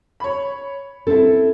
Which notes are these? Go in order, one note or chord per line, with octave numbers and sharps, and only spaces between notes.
C#5 B5
C4 E4 A4